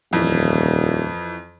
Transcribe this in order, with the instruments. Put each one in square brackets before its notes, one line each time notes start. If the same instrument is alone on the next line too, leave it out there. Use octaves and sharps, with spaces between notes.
[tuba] D#1 [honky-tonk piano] F2 E3